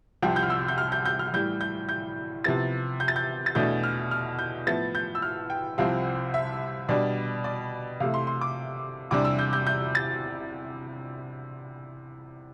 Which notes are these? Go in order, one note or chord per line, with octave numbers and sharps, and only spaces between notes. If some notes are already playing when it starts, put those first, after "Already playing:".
C2 C3 F3 G5
G6
F6
E6
G6
F6
G6
G6
F6
A2 E3 G3 G6
G6
G6
C3 F3 B3 E4 A6
G6
A6
G6
A6
E2 B2 A3 D4 G6
F6
F6
G6
A2 F3 B3 E4 A6
G6
E6
F6
G5
C2 C3 F3 C4 E4 F5
E5
B2 G3 D4 D5
D5
C3 E3 A3 F5
C6
C6
D6
E2 C3 G3 D4 D6
E6
G6
G6
G6
A6